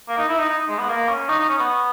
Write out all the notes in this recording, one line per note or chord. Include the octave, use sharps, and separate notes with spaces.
A#3
D#4
E4
D#4
D#4
G#3
B3
A#3
C#4
D#4
D#4
C#4
B3